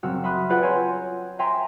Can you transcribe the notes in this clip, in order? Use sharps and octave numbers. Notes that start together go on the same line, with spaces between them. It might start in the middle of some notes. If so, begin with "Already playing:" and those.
F#1 C4 F#4 E6 F6
E5 B5 C6 D#6 F6 F#6
F4 G#4 B4 D5 F#5 G5
C#5 G#5 A#5 C6 E6 G6
E5 G5 G#5 A#5 C6